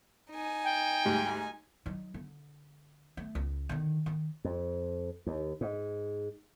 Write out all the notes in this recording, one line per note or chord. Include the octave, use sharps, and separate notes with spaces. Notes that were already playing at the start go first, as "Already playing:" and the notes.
D#4 G#5
G5
D2 G#2 G3
F#3 D#4
D3
A3
C#2
D3 D#3
D#3
F2
D#2
G#2